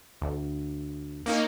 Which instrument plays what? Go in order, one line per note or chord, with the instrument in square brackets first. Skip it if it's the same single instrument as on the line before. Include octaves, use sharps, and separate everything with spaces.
[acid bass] D2
[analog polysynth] A#3 C#4 D#4